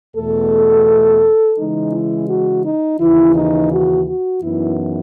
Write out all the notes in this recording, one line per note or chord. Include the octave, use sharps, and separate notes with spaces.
E2 B2 A3 A4
C#3 E3 G#3 D#4
E4
F#4
D#4
D#2 C#3 E3 E4
D#4
F#4
F#4
F#2 E3 B3 D#4 E4